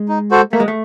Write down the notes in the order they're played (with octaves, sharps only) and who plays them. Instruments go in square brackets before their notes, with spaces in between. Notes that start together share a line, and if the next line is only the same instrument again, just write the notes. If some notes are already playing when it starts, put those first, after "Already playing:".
Already playing: [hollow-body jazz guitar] G#3
[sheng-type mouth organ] D#4
F#4 A4 C5
[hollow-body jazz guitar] A3 [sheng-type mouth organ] A#3
[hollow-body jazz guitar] G#3
A3